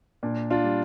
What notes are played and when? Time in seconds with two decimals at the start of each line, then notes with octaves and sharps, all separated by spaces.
0.23 A#2 D4
0.50 D4 F4
0.64 G3